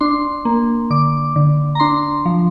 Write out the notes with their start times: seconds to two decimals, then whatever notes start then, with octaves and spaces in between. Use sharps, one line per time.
0.01 D4 C6
0.45 A#3
0.90 D3 D6
1.36 D3
1.75 A#5
1.80 D4 C6
2.25 F3